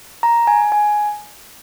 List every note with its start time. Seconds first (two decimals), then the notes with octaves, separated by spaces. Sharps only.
0.23 A#5
0.47 G#5
0.72 G#5